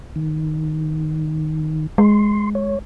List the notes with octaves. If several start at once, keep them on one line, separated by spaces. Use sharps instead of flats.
D#3
G#3 C6
C#5